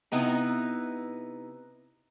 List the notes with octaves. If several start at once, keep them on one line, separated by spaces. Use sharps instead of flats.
C3 B3 D#4 E4 A#5